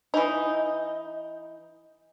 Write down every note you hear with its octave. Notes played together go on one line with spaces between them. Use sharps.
E3 D#4